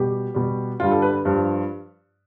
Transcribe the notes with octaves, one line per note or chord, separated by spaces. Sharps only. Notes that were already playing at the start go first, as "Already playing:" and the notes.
Already playing: B2 G3 G4
B2 G3
G2 D3 G3 F4
A4
B4
G2 F3